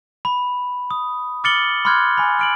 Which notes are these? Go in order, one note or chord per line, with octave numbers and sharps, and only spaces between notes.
B5
D#6
D6 F6 A6 C#7 F#7 G7
B5 C6 D6 F6 F#6 G#6
G#5 B5
F6 D7 F#7